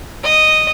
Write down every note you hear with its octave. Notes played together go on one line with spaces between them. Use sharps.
D#5